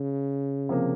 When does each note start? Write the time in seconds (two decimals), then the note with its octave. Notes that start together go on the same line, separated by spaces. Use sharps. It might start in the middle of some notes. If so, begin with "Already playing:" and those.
Already playing: C#3
0.69 C3 F3 A#3